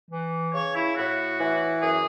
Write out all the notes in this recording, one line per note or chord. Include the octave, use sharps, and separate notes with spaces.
E3
C#3 C#5
E4
A2 F#4
E3
F#2 G#4